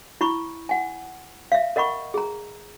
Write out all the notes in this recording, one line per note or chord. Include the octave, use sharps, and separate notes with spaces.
E4 B5 C#6
F#5 G#5
E5 F5
A#4 D#5 F#5 B5 C#6
G#4 A#5